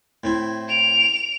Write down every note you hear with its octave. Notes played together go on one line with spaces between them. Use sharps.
A2 C4 E4
D7 F7